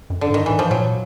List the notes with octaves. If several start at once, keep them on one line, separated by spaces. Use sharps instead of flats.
F#2
D3
G#2
D#3
A2 E3
F3
A#2 F#3